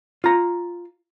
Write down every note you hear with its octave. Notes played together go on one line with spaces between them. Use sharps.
F4 A#5